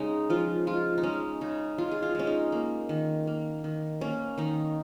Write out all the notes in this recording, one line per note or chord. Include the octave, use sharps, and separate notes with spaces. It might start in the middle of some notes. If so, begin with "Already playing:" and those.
Already playing: C#3 G#3 D#4
F3 F4
G#3 F4
D#4
G#3 C#4
C#3 D#4
G#3 F4
G#4
F4
G#3 C#4
D#4
A#3
D#3
A#3
D#3
A#3 C#4
D#3 D#4